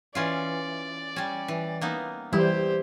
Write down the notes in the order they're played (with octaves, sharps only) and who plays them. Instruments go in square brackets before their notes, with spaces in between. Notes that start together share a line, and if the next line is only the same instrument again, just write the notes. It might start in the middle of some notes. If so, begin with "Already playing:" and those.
[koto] E3 C#4 F4 [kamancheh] D5
[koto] G3 C#4
E3
A#3 B3 D#4
[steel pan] E3 G3 [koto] E4 [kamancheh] G4 C5